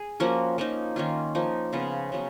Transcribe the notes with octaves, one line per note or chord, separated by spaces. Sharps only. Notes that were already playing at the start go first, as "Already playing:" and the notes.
Already playing: G#4
F3 A#3 C#4 F#4
F3 A#3 D#4
D#3 A#3 C#4 F4
F3 A#3 D#4
C#3 F3 B3 F4
C#3 F#3 B3